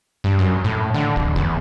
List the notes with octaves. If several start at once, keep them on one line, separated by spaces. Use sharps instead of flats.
G2
F#2
A2
D3
D1
E2